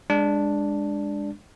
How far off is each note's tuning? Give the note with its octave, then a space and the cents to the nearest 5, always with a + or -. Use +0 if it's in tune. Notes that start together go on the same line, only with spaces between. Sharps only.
G#3 -20 D4 +0